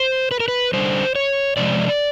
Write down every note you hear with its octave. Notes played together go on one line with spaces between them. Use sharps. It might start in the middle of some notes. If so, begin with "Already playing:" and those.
Already playing: C5
B4
A#4
B4
D3 G3 C5
C#5
C3 F3 G#3 D5